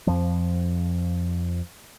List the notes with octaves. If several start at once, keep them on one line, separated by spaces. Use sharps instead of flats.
F2 F3